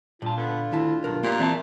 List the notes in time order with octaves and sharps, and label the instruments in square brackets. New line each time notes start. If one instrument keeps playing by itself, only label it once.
[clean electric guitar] G2 A5 [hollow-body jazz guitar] A#2 [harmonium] F4
[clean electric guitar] D3 [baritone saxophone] B3
[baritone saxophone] D2 [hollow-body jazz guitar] D#3 E4 A5
[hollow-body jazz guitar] B1 D4 A#4 [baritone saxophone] G2
[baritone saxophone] A#2 [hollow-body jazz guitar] A#3 G4 F5
[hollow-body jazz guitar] E3 C4 [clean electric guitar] G3 E5 A5